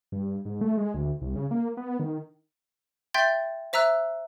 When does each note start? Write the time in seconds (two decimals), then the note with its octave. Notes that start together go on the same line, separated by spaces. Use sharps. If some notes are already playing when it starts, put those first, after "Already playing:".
0.12 G2
0.45 G#2
0.61 A3
0.77 G#3
0.94 D2
1.21 C2
1.35 C#3
1.51 A#3
1.77 B3
1.99 D#3
3.14 E5 G5 C6 G6 A6
3.73 C5 E5 A#5 E6 F#6